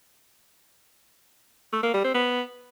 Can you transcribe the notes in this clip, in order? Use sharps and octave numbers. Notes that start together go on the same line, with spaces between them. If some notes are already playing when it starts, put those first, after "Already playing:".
A3
A#3
G3
C4
B3